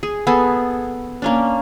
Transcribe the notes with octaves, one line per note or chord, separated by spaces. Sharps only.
G#4
B3 G#4 A4
A#3 C#4 D4